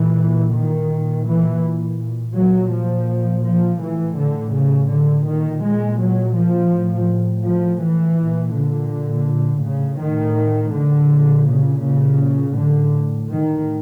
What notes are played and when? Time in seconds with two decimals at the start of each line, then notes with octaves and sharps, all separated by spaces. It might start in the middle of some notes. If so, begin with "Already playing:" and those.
Already playing: A#2 E3
0.54 D#3
0.90 A#2
1.25 E3
2.35 A#2 F#3
2.72 F3
3.44 F3
3.80 A2 E3
4.17 D3
4.53 C#3
4.90 D3
5.26 A#2 D#3
5.63 G#3
6.00 F#3
6.36 F3
6.72 A2
7.45 F3
7.81 E3
8.18 A#2
8.54 D3
9.63 A2 C#3
10.00 D#3
10.73 D3
11.10 A#2
11.46 C#3
11.82 C#3
12.55 A2 D3
13.28 D#3